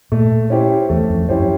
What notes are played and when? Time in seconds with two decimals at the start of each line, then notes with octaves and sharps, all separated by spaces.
0.12 A#2 A3
0.50 C#4 E4 G4 C5
0.89 E2 A3
1.09 F2
1.29 F#2 C#4 E4 G4 C5